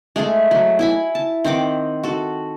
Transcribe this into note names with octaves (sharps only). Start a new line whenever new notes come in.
G#3 A3 G#4 A4
F#3
E4 G#5 B5
A5
D#3 C4 F#5 D6
F#4 A4